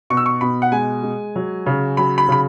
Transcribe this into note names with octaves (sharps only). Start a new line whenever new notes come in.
B2 C#6
E6
C#6
B2 B5
F#5
G#3 G#5
G#3
F#3
C#3
F#3 B5
B5
C#3 B5